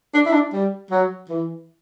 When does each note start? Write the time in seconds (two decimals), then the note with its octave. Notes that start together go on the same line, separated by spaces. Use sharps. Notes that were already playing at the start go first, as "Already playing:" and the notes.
0.14 D4
0.26 E4
0.33 D4
0.53 G3
0.91 F#3
1.29 E3